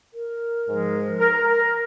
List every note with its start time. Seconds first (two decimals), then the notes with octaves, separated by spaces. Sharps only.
0.14 A#4
0.67 G#2 F3 G#3
1.20 A#4
1.34 A#4
1.47 A#4